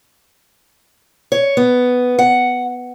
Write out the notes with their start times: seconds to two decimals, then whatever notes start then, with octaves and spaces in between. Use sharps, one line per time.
1.32 C#5
1.57 B3
2.19 F#5